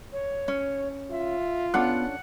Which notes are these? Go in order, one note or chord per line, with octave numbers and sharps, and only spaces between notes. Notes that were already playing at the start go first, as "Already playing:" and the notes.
C#5
C#4
F4 E5
B3 C#4 D4 A4 F#5